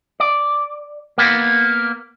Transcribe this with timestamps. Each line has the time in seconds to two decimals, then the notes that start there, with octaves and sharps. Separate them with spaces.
0.20 D5
1.18 A#3 B3